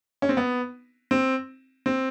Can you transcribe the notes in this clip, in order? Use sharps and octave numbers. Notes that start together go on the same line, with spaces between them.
C#4
C4
B3
C4
C4